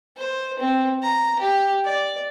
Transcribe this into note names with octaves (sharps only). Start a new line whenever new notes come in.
C5
C4
A#5
G4
D5